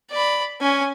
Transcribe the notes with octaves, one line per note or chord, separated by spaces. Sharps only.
D5 B5
C#4 G#5